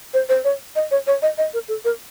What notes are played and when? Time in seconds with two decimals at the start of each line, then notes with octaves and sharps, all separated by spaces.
0.14 C5
0.29 C5
0.44 C#5
0.76 D#5
0.91 C#5
1.07 C#5
1.22 D#5
1.38 D#5
1.54 A#4
1.68 A4
1.85 A#4